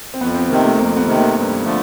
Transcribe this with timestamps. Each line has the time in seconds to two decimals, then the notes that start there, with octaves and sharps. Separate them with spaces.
0.14 C4
0.20 F2 B3
0.34 C4
0.49 C3 D#3 A#3
0.64 A3
0.78 F2 A#3
0.97 B3
1.07 C3 D#3
1.16 A#3
1.35 G2
1.64 D3 F3 A3